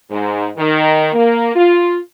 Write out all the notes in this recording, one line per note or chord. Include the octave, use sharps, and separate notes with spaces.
G#2
D#3
A#3
F4